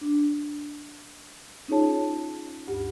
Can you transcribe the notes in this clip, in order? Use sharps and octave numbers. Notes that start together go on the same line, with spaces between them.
D4
C#4 D#4 F4 G#4 C#5 A5
D2 G2 G4